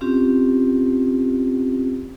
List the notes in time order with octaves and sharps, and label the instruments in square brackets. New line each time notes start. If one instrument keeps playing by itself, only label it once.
[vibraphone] C4 C#4 F4 G4